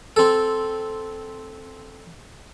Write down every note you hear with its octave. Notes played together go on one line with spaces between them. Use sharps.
C4 A4